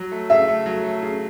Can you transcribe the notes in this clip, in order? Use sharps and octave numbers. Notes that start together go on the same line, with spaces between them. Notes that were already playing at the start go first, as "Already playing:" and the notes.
Already playing: F#3
A3
C#3 E5
A3
F#3
A3
C#3